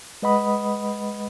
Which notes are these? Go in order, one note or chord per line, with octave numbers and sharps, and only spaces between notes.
G#3 B4 D#5 F#5 B5 D#6